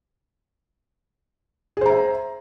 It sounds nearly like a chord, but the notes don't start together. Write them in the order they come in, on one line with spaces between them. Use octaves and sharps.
G#4 C5 A#5 E5